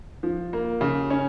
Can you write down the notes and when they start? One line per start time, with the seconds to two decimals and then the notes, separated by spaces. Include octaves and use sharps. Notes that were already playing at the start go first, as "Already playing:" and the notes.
0.23 F3
0.53 A#3
0.81 C#3
1.10 C#4